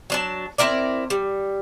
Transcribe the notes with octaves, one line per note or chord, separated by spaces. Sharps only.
F#3 D4 A5
C4 E4 A#4 D5
G3